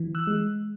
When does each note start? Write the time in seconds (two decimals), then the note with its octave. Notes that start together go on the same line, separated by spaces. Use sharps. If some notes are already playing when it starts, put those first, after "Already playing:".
Already playing: E3
0.15 E6 F#6
0.27 G#3